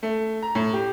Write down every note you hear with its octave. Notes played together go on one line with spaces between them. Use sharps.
A3
A#5
A2
G4